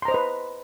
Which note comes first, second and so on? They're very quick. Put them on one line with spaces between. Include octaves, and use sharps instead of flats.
C6 A#5 C5 D#5 B4